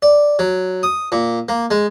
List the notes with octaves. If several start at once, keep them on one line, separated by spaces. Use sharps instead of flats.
D5
F#3
D#6
A#2
A#3
G#3